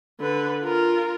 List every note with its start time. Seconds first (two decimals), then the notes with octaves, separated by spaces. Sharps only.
0.20 D3 B4
0.61 F4 A#4